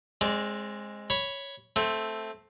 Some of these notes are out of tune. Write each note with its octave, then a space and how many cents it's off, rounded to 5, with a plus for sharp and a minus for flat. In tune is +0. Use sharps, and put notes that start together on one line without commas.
G#3 +0 C4 +25 D5 -25
C#5 +0 B5 +0
A3 +0 C4 +5